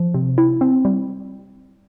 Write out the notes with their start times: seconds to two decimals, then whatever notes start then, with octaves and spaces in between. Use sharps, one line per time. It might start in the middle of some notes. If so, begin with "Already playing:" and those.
Already playing: F3
0.14 C3
0.38 E4
0.61 C4
0.85 G3